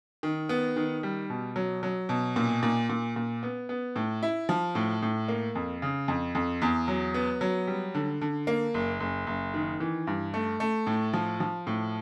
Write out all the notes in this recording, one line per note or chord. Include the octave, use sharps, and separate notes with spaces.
D#3
B3
D#3
G3
B2
F#3
F#3
B2
A#2
A#2
A#2
A#2
B3
B3
A2
E4
F3
A2
A2
A#3
F2
C#3
F2
F2
E2
F#3
B3
F#3
G3
D3
D3
A#3
F#1
F#1
F#1
D#3
E3
G2
A3
A3
A2
F3
F3
A2